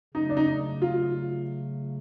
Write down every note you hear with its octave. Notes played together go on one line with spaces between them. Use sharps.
C#3 F#3 A3 D#4
D4
D#4
F4